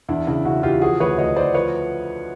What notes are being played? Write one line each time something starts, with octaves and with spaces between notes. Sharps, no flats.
E2 D4 E4
C#3 D4 E4
C#3 E4 F#4
E2 F4 G4
F3 F#4 G#4
D2 B4 C#5
D2 C#5 D#5
D2 C5 D5
F3 B4 C#5